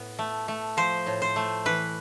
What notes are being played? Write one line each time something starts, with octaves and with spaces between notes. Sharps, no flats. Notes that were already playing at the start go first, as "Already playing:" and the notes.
Already playing: A2 B3
A3
A3
F3 C5
A2
C5
A3
E3 B4